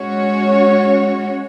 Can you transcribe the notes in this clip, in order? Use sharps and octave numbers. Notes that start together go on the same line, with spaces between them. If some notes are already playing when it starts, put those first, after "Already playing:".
Already playing: G#3 C#4 F#4 C#5